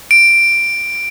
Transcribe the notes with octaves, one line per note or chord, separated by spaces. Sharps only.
D7